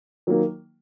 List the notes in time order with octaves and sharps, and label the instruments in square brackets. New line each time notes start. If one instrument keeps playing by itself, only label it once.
[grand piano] D#3 F#3 A#3